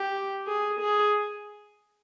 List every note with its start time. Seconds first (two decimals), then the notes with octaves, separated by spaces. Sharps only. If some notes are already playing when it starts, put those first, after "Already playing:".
Already playing: G4
0.47 G#4
0.80 G#4